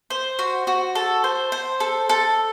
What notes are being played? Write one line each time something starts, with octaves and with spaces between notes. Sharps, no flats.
C5
F#4
F#4
A4
C5
C5
A4
A4